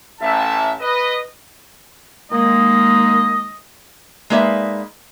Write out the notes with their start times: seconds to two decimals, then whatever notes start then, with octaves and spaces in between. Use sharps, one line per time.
0.21 A1 E5 A5
0.81 B4 D#5
2.32 D#3 G#3 A#3 D#5
4.30 G#3 A#3 D#4 B4 D5 E5